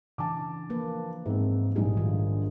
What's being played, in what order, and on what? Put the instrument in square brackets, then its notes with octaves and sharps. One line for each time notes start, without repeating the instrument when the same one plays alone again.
[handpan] C#3 E3 D4 [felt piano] A5 D6
[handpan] F3 A#3 B4
[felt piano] G#2 C4 [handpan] E5
[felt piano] A#1 G#2 G3 [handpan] A3 D4 G#4
[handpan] D#3 F4